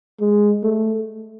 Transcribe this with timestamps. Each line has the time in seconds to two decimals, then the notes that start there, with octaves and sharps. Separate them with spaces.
0.20 G#3
0.63 A3